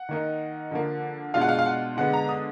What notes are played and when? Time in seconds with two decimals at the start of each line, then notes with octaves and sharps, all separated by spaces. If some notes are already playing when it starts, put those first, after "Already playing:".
Already playing: F#5
0.09 D#3 A#3 D#4
0.71 D3 F3 A#3
1.34 B2 G#3 D4 F4 F5
1.41 F#5
1.49 F5
1.59 F5
1.66 F#5
1.97 D3 G#3 B3 F#5
2.13 A#5
2.29 D#6